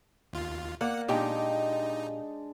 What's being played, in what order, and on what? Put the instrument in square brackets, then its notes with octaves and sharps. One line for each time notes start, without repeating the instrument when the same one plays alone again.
[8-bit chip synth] D#2 F4
[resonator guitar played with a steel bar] A#3 [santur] D5 [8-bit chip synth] F#5
[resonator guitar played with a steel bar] A#2 G4 G5 [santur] G#3 D4 [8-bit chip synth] D#4